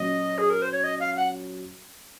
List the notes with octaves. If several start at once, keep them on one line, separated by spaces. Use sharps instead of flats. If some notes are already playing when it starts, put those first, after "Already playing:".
Already playing: A#2 F#3 C#4 D#5
G#4
A#4
C5
C#5
D#5
F5
F#5